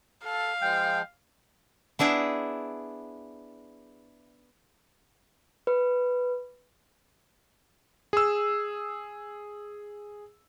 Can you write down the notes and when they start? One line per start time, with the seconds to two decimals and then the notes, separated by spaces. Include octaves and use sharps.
0.24 A4 F5
0.62 F3 G#3 G5
1.99 B3 D4 E4 G#4
5.67 B4
8.13 G#4 E6